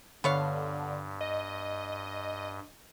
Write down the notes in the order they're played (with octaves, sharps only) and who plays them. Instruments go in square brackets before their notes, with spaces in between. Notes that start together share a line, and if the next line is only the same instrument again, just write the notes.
[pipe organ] G2 [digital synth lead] D3 [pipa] B3 C#5 F5
[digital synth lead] D#5